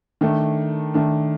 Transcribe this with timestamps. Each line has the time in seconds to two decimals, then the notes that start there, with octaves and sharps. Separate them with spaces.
0.21 D#3 A3 D4
0.94 D#3 A3 D4